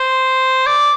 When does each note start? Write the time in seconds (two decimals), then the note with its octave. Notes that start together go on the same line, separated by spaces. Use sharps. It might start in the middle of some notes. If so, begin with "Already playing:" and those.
Already playing: C5
0.66 D5